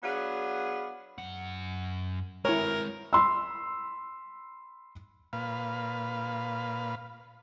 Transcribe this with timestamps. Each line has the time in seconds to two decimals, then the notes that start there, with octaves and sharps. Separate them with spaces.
0.03 F#3 B3 D4 G#4 F5 F#5
1.18 F#2 F#5
2.45 G#3 C4 E4 A#4 C#5
3.13 B5 C6 E6
5.33 A#2 B4 F5